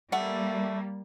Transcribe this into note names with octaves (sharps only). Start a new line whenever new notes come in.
G3 A3 A#3 F#5